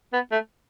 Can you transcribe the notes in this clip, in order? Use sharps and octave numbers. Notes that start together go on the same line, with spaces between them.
B3
A3